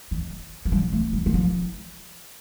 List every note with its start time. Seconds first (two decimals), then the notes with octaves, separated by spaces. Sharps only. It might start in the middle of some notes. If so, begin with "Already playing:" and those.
0.11 D#3
0.65 F3
0.72 G3
0.93 A3
1.13 G3
1.26 G3
1.34 F3